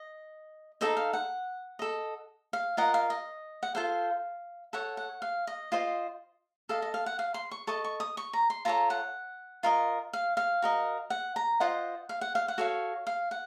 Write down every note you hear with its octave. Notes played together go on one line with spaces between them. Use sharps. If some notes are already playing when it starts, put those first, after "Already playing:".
Already playing: D#5
D#4 F#4 A4 C5 D#5
F5
F#5
A4 D#5
F5
F4 A#4 D#5 F#5
F5
D#5
F#5
F4 A4 C5 F5
A4 C#5 F#5
F#5
F5
D#5
F4 C5 D#5
A4 D#5 F5
D#5
F5
F#5
F5
C6
C#6
A4 D#5 C#6
C#6
D#6
C#6
A#5
C6
F4 A4 C#5 A#5
F#5
F4 A#4 D#5
F5
F5
F#4 A#4 D#5
F#5
A#5
F4 C5 D#5 F#5
F5
F#5
F5
F#5
F#4 A4 C#5 F5
F5
F#5